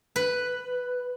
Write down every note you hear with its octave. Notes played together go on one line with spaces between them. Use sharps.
B4